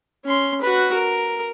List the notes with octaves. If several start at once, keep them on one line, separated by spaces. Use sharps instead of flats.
C#4 C6
F#4 B4
A#4